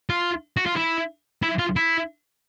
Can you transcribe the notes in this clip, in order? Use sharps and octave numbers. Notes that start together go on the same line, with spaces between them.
F4
F#4
F4
E4
E4
F4
E4